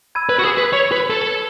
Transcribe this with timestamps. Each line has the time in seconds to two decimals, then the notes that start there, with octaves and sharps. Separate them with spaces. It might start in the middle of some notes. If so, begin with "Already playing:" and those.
0.15 B5 E6 G#6 D#7
0.29 B4
0.39 F#4
0.44 G#4
0.58 B4
0.73 C#5
0.92 B4
1.10 A4